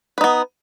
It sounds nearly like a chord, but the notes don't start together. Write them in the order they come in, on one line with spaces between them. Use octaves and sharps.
B4 D#4 B3